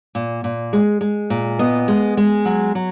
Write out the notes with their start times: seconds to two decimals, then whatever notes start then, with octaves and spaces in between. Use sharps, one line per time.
0.15 A#2
0.44 A#2
0.73 G#3
1.01 G#3
1.30 A#2
1.59 B3 D#5
1.88 G#3
2.17 G#3
2.45 F#3
2.75 F#3